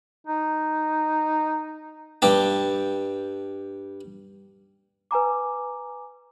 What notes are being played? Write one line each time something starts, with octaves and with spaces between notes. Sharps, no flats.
D#4
G2 G4 A5
B4 G#5 A#5 D6